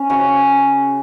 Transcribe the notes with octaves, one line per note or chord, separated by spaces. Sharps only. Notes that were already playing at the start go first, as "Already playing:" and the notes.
Already playing: C#4
C#3 F#4